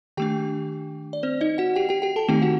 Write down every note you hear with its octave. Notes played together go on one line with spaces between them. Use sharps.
D#3 A3 D4 G4 G5
D5
C4 C5
D#4 D#5
F#4 F#5
G4 G5
G4 G5
G4 G5
A4 A5
D#3 A3 C4 D#4 G4 G5
F#4 F#5